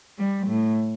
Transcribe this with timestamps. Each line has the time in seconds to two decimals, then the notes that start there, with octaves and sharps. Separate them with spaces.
0.18 G3
0.47 A2